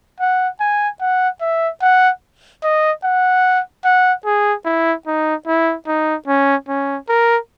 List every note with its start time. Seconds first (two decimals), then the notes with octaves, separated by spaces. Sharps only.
0.20 F#5
0.60 G#5
1.00 F#5
1.41 E5
1.82 F#5
2.63 D#5
3.04 F#5
3.85 F#5
4.25 G#4
4.65 E4
5.07 D#4
5.47 E4
5.87 D#4
6.27 C#4
6.68 C#4
7.09 A#4